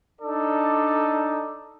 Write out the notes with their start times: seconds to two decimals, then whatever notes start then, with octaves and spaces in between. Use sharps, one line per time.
0.22 D4 D#4 A4 D5